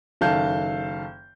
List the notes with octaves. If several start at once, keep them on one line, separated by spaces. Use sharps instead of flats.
F#1 D#3 A4 F5 A5 G6